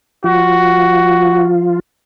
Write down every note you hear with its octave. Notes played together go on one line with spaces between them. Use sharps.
F3 F4 F#4